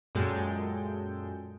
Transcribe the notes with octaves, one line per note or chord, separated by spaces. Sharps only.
F#2 A#2 G#3 A4 G5